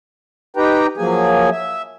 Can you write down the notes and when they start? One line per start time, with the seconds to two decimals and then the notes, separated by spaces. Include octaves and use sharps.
0.57 D#4 G4 B4 G5 A#5
0.97 F3 F#3 A#3 G#4 G#5
1.51 E5